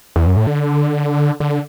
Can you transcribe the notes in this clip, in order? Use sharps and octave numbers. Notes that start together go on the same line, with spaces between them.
E2
F#2
A2
D3
D3